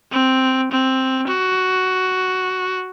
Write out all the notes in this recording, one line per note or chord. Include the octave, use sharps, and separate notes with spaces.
C4
C4
F#4